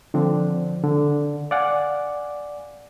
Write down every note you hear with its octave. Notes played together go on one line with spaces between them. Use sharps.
D3 F3 C4 D4
D3
D5 F5 F#5 G#5